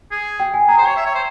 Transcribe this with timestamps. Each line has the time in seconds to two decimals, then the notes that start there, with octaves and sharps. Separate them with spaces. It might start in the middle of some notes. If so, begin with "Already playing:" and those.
0.12 G#4
0.40 G5
0.54 G#5
0.68 G#4 A#5
0.78 C5
0.82 C#5 G5
0.97 E5
1.06 C#5
1.15 C5